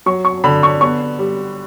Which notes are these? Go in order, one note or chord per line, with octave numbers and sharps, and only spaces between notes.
F#3 C#6
C#6
D3 B5
C#6
B3 C#6
G3